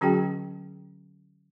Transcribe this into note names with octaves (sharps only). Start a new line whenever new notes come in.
D3 F#3 C#4 F#4 G#4 G5